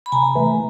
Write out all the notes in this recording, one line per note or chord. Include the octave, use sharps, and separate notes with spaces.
B5
C3 G#5 A#5
E3 A3